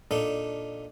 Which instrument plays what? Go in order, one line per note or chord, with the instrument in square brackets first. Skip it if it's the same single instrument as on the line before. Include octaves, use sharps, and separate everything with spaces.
[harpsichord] A#2 D4 D#4 A4